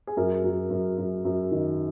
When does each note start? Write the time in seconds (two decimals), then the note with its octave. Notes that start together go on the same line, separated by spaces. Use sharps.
0.07 G#4
0.17 F#2 A#4
0.44 F#2
0.70 F#2
0.98 F#2
1.25 F#2
1.52 D#3